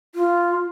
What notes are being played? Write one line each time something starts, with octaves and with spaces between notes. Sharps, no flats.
F4